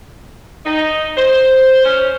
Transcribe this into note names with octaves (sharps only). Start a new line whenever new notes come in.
D#4
C5
C#4